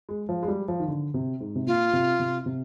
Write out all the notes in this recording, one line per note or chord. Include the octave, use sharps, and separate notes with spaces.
G#3
F3
G#3
G3
F3
D#3
D3
C3
G#2
C3
A#2 F4
C3
C3
C3